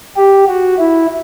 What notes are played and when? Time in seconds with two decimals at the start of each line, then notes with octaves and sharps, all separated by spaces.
0.16 G4
0.48 F#4
0.78 E4